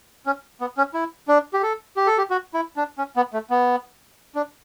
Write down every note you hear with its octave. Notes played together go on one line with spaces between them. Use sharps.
C#4
B3
C#4
E4
D4
G4
A4
G4
A4
G4
F#4
E4
D4
C#4
B3
A3
B3
D4